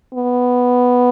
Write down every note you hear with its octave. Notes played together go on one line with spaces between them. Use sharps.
B3